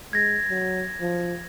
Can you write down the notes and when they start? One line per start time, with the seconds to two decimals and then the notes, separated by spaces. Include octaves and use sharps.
0.13 G#3 G#6 A#6
0.50 F#3
1.01 F3